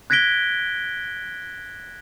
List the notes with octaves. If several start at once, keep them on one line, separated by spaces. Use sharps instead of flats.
F#6 G#6 A#6 B6 D7 G7